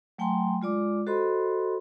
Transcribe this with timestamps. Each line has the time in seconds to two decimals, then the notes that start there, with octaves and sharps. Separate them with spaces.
0.18 F#3 A3 G5 G#5 A#5 C6
0.62 G#3 F4 D5 D6
1.07 F#4 A4 C5 D#5 B5 C6